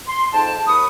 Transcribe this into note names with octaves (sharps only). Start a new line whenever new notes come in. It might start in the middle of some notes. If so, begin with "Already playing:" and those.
C6
F2 G#2 G5 A5
D#2 B4 C#6 D#6